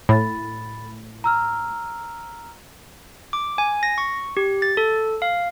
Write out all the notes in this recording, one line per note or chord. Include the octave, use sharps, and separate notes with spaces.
A2 B5 A6
A#5 E6 F6
D6
G#5
A#6
C#6
G4
A6
A4
F5